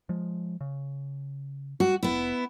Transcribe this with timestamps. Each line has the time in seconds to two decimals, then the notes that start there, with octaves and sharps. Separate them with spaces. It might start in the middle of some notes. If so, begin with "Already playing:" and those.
0.09 F3 G#3
0.61 C#3
1.80 G3 F#4
2.03 F1 B3 E4